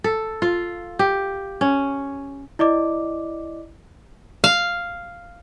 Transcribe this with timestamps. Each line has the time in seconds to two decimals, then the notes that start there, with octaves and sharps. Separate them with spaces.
0.04 A4
0.42 F4
0.99 G4
1.61 C#4
2.59 E4 D5 D#5 D6
4.44 F5